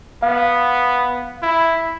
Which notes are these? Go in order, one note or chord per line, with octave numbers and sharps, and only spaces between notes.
B3 F5
E4